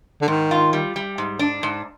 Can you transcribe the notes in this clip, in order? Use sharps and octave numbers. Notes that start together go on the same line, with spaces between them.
D3
G#2 D#3
F4
G3
G3
G#2
D4
G#2